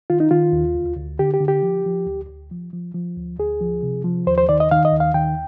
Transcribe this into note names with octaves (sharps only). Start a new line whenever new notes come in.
D#3 F4
D#4
D#3 F4
D#2
D2
D2
D3 G4
G4
D3
G4
F3
F3
D2
D2
F3
F3
F3
D2
D2 G#4
F3
C3
F3
D#2 C5
C5
D#3 D5
D#5
D#3 F5
D#5
D#2
F5
D#3 G5